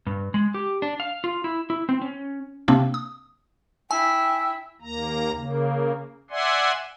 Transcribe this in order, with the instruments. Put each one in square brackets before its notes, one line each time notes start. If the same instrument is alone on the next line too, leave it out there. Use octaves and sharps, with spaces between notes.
[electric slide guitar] G2
G#3
G4
D4
F5
F4
E4
E4
C4
C#4
[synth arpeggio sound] C3 A#3 C4 D4
D#6
[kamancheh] E4 [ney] G5 [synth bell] G#5 [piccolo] E6
[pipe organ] D#2 A#3 A#5
C#3 A#3
D5 E5 F#5 G#5 C6